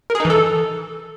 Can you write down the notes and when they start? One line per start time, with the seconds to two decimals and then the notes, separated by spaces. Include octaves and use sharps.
0.10 A#4
0.15 G#4
0.20 D#4
0.25 E3
0.30 A4